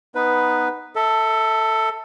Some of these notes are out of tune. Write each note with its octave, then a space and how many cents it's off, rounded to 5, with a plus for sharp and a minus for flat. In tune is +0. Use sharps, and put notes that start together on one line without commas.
B3 +0 D#4 +0 B4 +0
A4 +15 E5 -25